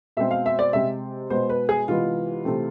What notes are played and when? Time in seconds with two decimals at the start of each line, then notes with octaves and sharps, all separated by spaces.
0.17 B2 G#3 C4 E5
0.31 F5
0.46 E5
0.59 D5
0.73 C3 G#3 C4 E5
1.30 B2 G#3 B3 C5
1.49 B4
1.69 G#4
1.87 C3 E3 G#3 B3 F4
2.45 C3 E3 A3 C4